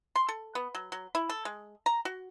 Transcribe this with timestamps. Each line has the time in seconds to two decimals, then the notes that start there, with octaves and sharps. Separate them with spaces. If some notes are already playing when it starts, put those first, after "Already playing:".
0.16 C6
0.29 A4
0.55 B3
0.75 F#3
0.92 F#3
1.15 E4
1.29 A4
1.45 G#3
1.86 A#5
2.05 F#4